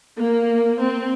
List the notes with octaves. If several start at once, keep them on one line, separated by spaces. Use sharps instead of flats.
A#3
C4